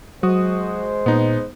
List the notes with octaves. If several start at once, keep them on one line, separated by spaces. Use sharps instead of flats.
F#3 G#3 F#4 C5 D#6
A#2 B3 D#4